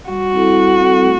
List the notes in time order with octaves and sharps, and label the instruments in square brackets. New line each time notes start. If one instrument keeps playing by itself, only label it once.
[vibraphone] G3 [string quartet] F#4
[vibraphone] C4 E4 A4
G3
C4 E4 A4
A3